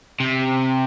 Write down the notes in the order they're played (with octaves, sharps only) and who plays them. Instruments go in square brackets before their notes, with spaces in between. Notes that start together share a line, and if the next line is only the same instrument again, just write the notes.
[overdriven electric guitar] C3